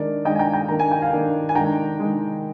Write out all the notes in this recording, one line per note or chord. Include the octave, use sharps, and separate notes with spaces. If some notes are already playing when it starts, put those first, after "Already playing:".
Already playing: D#3 G#3 D4 A#4 D5
D#3 G#3 D4 D#5 G5
G#5
G5 A#5
G5 A#5
D#3 A#3 D4 A#5
G#5
G5
F5 G#5
D#3 A#3 D4
G#5
D#3 G#3 D4 G5 A#5
D#3 G#3 D4